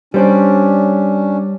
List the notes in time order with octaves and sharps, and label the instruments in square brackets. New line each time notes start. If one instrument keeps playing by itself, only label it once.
[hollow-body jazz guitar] G3 C5 D5 [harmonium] C#4 D4